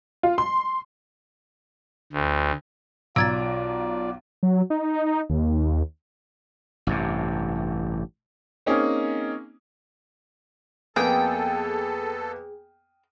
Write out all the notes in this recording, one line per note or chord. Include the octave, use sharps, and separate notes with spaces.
F4
C6
D2
B1 F4 D5 A#5 E6 G#6 A6 D7
F#3
D#4
D#2
A1 G2 C3
A#3 C4 C#4 D#4 G#4
F2 A#3 B3 G#4 A4 G5